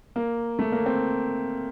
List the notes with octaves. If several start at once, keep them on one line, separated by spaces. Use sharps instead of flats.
A#3
A3
A#3
C4